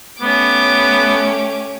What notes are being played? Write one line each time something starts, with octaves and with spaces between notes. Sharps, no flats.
A3 B3 C#4 G4 D6